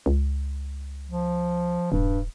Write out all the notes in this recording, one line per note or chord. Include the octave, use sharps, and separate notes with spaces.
C#2
F3
D#1 G2